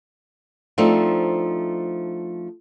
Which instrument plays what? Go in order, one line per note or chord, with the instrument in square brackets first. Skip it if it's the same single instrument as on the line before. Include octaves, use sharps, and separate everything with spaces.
[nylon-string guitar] F3 A3 C4 D4 D#4